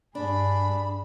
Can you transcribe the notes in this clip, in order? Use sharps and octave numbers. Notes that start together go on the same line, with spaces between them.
G2 D4 G#4 D5 B5